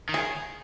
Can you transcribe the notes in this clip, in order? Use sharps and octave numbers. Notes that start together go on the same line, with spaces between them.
D#3
G#4